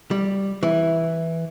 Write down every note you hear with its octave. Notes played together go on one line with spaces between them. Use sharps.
G3
E3